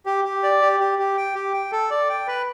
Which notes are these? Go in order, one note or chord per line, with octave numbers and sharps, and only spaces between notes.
G4
G4
D5
G4
G4
G4
G5
G4
G5
A4
D5
G5
B4